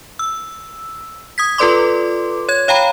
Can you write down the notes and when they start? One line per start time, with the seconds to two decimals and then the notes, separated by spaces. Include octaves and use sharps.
0.19 E6
1.38 D#6 G#6 B6
1.58 F4 A4 B4 D5 C6 D6
2.49 C#5 G#6
2.68 C#5 F5 G5 A#5 B5